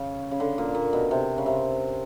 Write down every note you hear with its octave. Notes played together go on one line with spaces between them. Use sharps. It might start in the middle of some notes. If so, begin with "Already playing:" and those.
Already playing: C#3
C#3
D3
A#2
A#2
B2
C3
C#3
C3